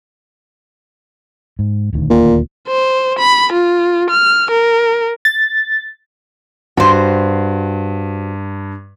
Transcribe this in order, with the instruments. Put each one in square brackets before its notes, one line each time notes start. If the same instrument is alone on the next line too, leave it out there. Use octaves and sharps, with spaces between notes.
[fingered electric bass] G#2
D#1 D2 D#3
[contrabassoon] A#2
[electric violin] C5
B5
F4
F6
A#4
[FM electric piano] A6
[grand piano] G2 [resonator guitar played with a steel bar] F#4 C5